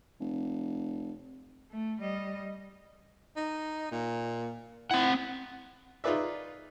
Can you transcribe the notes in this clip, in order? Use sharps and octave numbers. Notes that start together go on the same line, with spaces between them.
F1
A3
G3 D#5
D#4
A#2
C4 E4 F#5
D#4 F4 G#4 B4 D5 E5